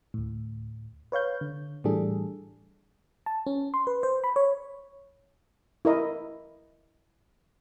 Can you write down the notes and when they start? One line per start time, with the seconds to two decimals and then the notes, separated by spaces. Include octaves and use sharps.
0.14 D2 A2
1.12 B4 C#5 F5 G6
1.41 D3
1.84 A2 E3 G3 D4 G#4 A4
3.26 A5
3.47 C#4
3.74 C6
3.87 B4
4.03 C5
4.24 B5
4.36 C#5
5.85 E4 A#4 D#5